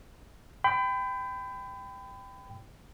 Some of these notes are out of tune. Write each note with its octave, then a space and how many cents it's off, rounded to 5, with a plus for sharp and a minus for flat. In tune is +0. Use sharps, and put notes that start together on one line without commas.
G5 +0 B5 +35